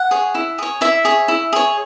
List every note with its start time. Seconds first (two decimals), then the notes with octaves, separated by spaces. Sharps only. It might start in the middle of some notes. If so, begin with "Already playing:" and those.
Already playing: F#5
0.11 G#4 C#5
0.35 E4
0.58 G#4 C#5
0.81 E4 E5
1.05 G#4 C#5
1.28 E4
1.53 G#4 C#5